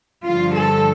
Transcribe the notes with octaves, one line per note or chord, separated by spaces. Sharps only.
G2 D3 F3 F4
A4